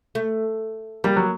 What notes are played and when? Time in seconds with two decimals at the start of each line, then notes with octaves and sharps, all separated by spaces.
0.15 A3
1.04 G3 A#3
1.16 F#3